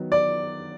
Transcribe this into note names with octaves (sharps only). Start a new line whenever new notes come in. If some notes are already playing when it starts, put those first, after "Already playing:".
Already playing: D#3 F#3 B3
D5